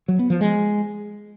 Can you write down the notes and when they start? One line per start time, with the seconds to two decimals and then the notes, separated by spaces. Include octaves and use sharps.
0.08 F#3
0.19 B3
0.30 F3
0.41 G#3